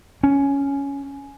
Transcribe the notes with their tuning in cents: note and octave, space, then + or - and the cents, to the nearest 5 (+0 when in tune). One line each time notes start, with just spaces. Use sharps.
C#4 +10